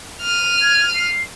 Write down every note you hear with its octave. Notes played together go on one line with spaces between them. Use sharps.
F6 D#7
G#6
C7